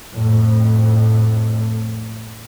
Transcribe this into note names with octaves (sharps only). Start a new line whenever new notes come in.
F2 A2